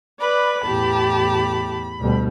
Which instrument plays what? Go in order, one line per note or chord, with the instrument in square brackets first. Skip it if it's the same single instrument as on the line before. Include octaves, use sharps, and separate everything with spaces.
[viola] B4 D5 [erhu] B5
[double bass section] E2 A2 [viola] G4 A5
[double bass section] D2 B2 G3